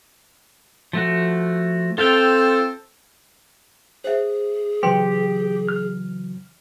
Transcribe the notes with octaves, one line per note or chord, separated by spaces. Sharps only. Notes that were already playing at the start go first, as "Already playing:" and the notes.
F3 A3 F#4
C4 F4 A4 F5 G5
G#4 C5 E5
C#3 E3 F#3 G4 B4 G5 C6
F6